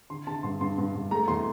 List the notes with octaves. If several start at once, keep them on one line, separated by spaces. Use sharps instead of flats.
D3 C6
D3 A5
G2 C6
G2 C6
G2
G2
A3 A#5
E2 C6